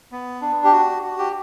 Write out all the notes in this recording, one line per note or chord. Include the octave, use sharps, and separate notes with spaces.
B3
D4
G4
F#4
F#4
G4